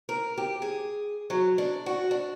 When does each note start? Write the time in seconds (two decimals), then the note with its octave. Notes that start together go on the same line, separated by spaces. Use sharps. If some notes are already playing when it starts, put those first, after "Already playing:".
0.09 A#4
0.38 G4
0.62 G#4
1.30 F#3
1.58 D4
1.86 F#4
2.11 D4